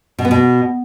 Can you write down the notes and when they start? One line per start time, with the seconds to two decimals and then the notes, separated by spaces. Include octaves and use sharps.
0.19 B2
0.25 B3
0.31 B2